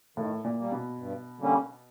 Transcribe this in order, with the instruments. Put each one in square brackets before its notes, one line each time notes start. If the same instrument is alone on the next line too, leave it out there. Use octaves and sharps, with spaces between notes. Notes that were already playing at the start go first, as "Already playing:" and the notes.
[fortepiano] A2 [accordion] D#3
[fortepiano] A#2
[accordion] G3 A#3
[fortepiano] B2
[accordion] G2
D3 G3 A#3 C#4